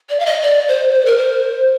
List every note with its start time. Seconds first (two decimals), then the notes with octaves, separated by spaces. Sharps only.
0.09 D5
0.19 F5
0.26 D#5
0.42 D5
0.68 C5
0.93 C5
1.05 A#4
1.18 C5